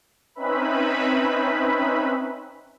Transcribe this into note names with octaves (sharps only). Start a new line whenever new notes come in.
C4 C#4 D#4 B4 E5 B5